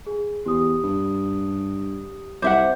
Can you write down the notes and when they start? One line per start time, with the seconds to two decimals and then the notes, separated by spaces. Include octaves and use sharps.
0.07 G#4
0.46 E2 G4 D#6
0.83 G2
2.42 C2 C5 E5 F#5 D6